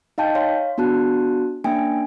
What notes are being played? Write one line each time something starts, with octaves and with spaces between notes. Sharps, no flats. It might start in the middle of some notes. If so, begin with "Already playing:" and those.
D#4 D#5 F5 G5 A5 G6
C#5 F5 C6
B3 D4 F#4 A5 F#6
A#3 C#4 D4 G5 G#5